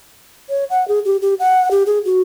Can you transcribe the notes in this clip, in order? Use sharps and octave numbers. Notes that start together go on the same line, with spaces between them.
C#5
F#5
G#4
G4
G4
F#5
G4
G#4
F#4